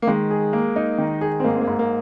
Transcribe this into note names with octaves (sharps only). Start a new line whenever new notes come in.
A#3
D#3 G#3
G#4
A#3
D#4
D#3
G#4
C4
G#2 A#3
C4
A#3
G#2
A#3